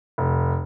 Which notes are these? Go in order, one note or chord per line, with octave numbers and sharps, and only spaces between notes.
F1